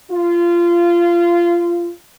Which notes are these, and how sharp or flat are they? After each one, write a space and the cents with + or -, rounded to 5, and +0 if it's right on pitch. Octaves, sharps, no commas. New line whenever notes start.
F4 -20